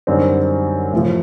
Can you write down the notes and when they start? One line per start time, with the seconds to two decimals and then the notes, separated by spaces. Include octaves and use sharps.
0.07 F#2 D3 G3 C4 D#4
0.93 A1 A2 F3